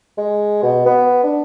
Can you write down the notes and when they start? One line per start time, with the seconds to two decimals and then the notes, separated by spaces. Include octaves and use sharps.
0.18 G#3
0.62 B2
0.86 B3
1.23 D4